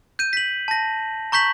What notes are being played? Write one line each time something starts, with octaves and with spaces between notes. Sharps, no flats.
G6 D#7
B6 F#7
A5 A#6
A#5 C#6 G6 B6 F#7